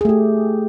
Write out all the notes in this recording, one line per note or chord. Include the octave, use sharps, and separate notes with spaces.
A3 G4 G#4